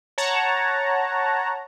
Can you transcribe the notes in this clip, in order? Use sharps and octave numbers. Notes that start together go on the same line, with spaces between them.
C#5 F#5 A5 A#5